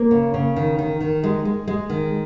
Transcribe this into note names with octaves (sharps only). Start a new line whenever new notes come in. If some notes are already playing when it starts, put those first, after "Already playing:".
Already playing: A#3
C#3
C#3
D#3
D#3
D#3
G#3
G#3
G#3
D#3